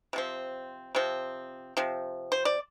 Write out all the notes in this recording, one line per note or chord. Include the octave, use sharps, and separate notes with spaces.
C3 F3 C4
C3 F3 C4
C3 F3 C4
C5
D5